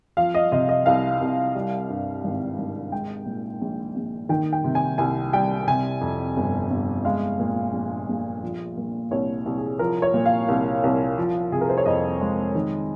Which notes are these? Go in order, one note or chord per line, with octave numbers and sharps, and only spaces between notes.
F3 F5
D#5
C3 D#5
D#5
C2 F5
C2
G3
G2
G#1
G#1
G#3 G5
A#2
A#1
A#1
D#3 G5
G5
C3
G#5
C2 G#5
G3 G5
C3 G#5
F2
G1
G1
G#3 F5
A#2
A#1
A#1
F3
A#2
C2 C#5
C2
G#4
F3 A#4
C#5
A#2
F5
C2
C2
F3
C3 G#4
A#4
C5
C#5
F2 D#5
G#3
D#3